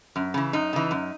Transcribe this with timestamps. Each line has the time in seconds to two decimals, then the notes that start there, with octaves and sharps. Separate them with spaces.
0.16 F#2
0.34 C#3 E3
0.53 F#2 D#4
0.73 C#3 E3
0.91 F#2